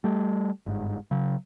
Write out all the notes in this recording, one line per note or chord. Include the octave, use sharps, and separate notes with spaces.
G3 A3
G1 G#2
C#3 F#3